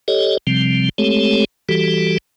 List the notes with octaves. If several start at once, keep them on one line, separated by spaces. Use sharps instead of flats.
G4 A4 C#5 D#5
C3 F3 G3 C4
G#3 A3 C4 G4 A4 C#5
E3 G3 F#4 G4 A4